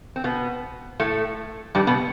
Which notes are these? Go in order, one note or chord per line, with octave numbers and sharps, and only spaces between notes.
C4
B2 B3
A2 A3
G2 G3
B2 B3